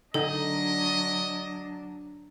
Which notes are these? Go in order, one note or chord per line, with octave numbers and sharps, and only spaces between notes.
D3 F#3 D4 D#4 A4 D#5